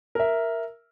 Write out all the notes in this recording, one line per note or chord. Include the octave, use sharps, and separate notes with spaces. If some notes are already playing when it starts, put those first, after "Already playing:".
A#4 E5